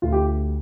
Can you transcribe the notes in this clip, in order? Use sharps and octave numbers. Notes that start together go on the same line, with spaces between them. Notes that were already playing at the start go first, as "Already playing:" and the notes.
D2 F4
G4